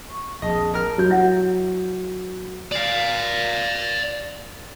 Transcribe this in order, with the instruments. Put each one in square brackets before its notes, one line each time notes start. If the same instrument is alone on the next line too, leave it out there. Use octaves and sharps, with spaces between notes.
[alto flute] C#6
[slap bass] A#1 F2 [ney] G#4 [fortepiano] D#5 [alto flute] A5
[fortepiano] A#4 F6
[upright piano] F#3 G6
[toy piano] E4 E5 F#5
[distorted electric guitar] D5 F5